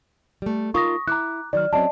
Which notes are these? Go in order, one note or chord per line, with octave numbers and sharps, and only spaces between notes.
G3 A3
D#4 F4 A#4 C#6 D#6 A#6
E4 A#5 D6 F#6
D#3 F#3 D5 F6
F#3 C4 C#4 D5 D#5 A5